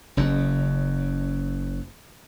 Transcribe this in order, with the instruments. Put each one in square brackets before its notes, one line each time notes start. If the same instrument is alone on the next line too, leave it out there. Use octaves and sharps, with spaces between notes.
[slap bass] F#1 F#2